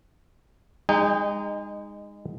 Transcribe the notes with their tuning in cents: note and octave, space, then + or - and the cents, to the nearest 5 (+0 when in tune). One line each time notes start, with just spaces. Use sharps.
G#3 -25 D#4 -10 G5 +35